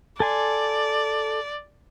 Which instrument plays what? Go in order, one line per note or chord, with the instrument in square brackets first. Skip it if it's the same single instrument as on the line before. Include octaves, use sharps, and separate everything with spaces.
[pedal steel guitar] A4 G#5 C6 [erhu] D5